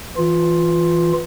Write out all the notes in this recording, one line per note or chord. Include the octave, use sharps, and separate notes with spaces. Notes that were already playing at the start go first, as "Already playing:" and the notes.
E3 F4